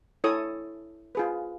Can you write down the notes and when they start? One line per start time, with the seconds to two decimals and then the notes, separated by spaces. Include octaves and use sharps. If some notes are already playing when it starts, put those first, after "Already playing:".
0.24 E4 A4 C#5 D#6
1.15 F4 G#4 B4